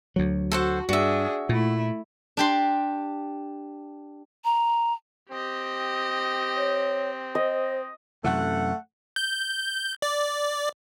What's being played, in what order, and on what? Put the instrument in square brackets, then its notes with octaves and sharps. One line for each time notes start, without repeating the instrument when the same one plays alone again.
[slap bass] D2 F#3
[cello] F#4 [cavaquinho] A4 C5 F#5
[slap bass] G2 [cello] D4 G#4 [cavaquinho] F#4 E5
[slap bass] A#2 [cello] A3 E4
[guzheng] D4 G4 C6
[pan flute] A#5
[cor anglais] C4 [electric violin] G4 D#5
[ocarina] C#5
[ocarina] C5 [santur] D#5
[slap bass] F#2 C3 E3 [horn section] A3 F#5
[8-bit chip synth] G6
D5